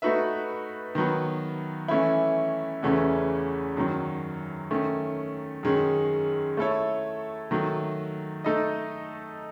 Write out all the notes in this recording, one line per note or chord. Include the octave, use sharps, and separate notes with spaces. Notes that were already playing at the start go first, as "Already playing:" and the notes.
A3 D#4 F#4 B4 E5
D#3 F#3 B3
E3 A3 C#4 E4
E2 C#3 E3 A3 C#4
F#2 D#3 F#3
D#3 A3 C#4
F#2 D#3 G#3 C#4
A3 E4 A4 C#5
D#3 F#3 A3
A3 D#4 A4 D#5